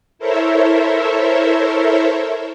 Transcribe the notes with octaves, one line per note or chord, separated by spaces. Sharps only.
E4 A4 A#4 C5 C#5 E5